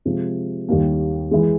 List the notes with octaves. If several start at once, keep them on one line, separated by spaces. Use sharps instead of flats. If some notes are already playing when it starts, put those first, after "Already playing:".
C3 F3 G#3
D#2 D#3 G3 A#3
E3 G#3